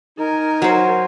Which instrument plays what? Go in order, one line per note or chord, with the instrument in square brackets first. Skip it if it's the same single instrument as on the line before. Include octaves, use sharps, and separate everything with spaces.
[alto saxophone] D#4 [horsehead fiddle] A#4 G#5
[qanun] F#3 C5